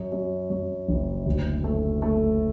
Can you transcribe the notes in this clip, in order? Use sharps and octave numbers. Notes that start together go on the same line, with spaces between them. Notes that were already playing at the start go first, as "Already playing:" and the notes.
Already playing: F#2
F#2
F#2
F#1
D2
A3
A3